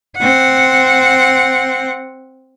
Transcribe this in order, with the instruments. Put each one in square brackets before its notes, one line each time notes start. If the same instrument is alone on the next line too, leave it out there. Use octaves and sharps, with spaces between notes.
[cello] C4 F#5